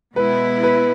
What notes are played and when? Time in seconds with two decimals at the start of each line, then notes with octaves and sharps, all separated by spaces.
0.16 B2 G#3 B3 E4 B4
0.63 B4